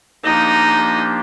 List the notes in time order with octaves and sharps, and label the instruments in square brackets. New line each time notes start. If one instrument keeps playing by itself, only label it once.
[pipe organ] F3 A#3 D4 G4 [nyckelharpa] D#4